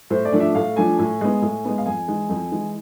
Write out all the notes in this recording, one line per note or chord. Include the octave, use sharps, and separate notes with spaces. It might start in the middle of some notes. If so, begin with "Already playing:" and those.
A2 C5
D5
F3 A3 D4
E5
A2 F5
F3 A3 D4 G#5
A2 G#5
G#3 B3
A2
G#3 B3
F5
F2 G#5
E3 G#3
F2
E3 G#3